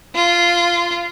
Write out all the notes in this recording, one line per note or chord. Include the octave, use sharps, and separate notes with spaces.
F4